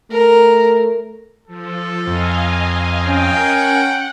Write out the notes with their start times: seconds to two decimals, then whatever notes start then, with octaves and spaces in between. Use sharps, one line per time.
0.11 A3 A#4
1.47 F3 A4
2.07 F2 D#5 F5 G#5
3.06 C#4 G5
3.37 A#4 F#5 G#5